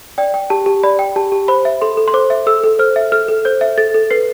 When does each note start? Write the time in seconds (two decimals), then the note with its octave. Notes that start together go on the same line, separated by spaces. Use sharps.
0.18 D5 G5
0.34 G5
0.50 G4 A5
0.66 G4
0.83 D5 B5
0.99 G5
1.16 G4 A5
1.32 G4
1.48 C5 B5
1.65 E5
1.81 A4 C6
1.97 A4
2.08 C6
2.14 C5 D6
2.30 E5
2.47 A4 E6
2.64 A4
2.79 C5 F6
2.96 E5
3.12 A4 F6
3.29 A4
3.45 C5 G6
3.61 E5
3.78 A4 A6
3.94 A4
4.10 B4 C7